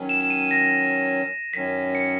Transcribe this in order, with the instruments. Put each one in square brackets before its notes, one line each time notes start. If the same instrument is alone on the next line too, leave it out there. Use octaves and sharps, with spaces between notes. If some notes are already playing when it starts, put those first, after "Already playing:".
Already playing: [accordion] D#3 F#3 C#4
[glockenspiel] E7
E7
D#7
A#6
[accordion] F#2 D#3 F#3 C#4 [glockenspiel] B6
[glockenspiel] C#7